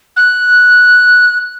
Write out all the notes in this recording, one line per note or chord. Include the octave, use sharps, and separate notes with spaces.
F#6